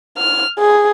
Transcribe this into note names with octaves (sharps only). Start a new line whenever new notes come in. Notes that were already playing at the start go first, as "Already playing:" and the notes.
F6
G#4